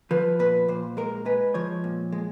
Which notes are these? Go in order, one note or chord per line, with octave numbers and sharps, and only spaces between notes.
F3 B4
A#2 B4
A#2 C5
G#3 A#4
G#3 B4
F3 C#5
A#2
G#3